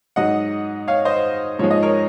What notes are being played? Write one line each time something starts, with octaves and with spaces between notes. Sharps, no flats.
G#2 F#3 D#5 F#5
C#5 F5
C5 D#5
G#2 F3 G#3 C#5
D#5
A#4 C#5